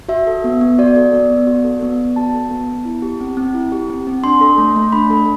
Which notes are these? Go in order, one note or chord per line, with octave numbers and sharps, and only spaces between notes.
F#4 E5
A4
B3
B3
F#4 D5
A4
B3
B3
F#4
A4
B3
B3
F#4 A5
A4
B3
B3
E4
G4
C4
C4
E4
G4
C4
C4
D4 C6
A4
A3
A3
D4 B5
A4